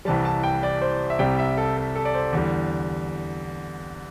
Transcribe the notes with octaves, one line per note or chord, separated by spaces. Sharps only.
C2 C3 E3 G3 A5
A5
G5
D5
C5
E5
C2 C3 G3 G5
E5
A4
A4
A4
D5
C5
E2 D3 G3